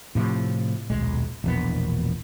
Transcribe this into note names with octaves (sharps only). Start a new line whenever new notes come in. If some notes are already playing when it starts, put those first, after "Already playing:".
A2 C3 F3
D#1 B1 G#3
E1 A#1 B3